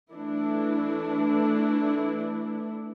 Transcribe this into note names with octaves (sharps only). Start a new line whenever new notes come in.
E3 A3 D4 E4